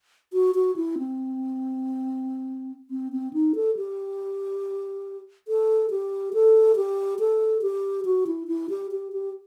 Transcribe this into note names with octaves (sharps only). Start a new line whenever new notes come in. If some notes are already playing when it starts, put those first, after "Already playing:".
F#4
F#4
E4
C4
C4
C4
D#4
A4
G4
A4
G4
A4
G4
A4
G4
F#4
E4
E4
G4
G4
G4